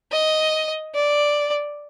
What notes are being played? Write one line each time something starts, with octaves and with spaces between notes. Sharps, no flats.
D#5
D5